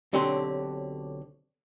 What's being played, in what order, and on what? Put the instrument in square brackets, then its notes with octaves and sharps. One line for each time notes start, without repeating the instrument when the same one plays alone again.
[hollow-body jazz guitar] B1 D3 F#3 C4 G4 C6